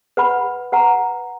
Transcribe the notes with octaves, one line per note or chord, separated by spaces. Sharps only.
B4 F#5 B5
B4 F#5 A#5